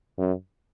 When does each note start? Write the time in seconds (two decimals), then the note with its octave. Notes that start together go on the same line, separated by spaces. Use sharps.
0.19 F#2